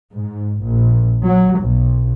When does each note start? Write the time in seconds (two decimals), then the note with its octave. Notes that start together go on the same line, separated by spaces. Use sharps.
0.13 G#2
0.63 A#1
1.23 F#3
1.61 B1